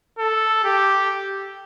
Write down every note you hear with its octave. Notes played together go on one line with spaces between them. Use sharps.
A4
G4